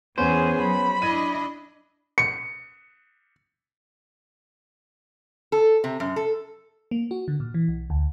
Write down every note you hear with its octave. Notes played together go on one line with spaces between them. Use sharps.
E2 B3 C#4 G#4 C5 G#5
F#3 B5
D4 E4 D#5 G#6 D#7
C#7
A4
C3
F#2
A4
A#3
F#4
D3
A#2
E3
B1
D2